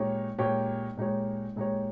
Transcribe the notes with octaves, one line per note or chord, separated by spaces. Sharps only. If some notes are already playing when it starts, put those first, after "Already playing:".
Already playing: A#2 G#3 D#4 G4 C#5
A#2 G#3 D#4 G4 C#5
A#2 G#3 D#4 G4 C#5
A#2 G#3 D#4 G4 C#5